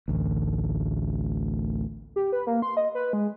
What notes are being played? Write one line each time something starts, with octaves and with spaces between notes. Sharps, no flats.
A1 D2
G4
B4
A#3
C6
D#5
B4
G#3